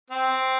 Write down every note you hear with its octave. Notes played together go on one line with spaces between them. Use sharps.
C4